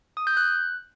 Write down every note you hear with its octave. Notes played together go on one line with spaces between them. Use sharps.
D#6
G6
F#6